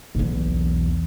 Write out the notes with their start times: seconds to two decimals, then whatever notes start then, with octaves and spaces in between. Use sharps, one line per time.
0.15 B1 E2